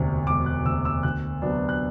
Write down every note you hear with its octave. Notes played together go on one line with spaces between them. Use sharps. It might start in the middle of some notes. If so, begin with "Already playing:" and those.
Already playing: E1 D2 C3
E1 D6
F#6
D2 C3 E6
E6
D2 F#6
C3 F#3 B3 D4
F#6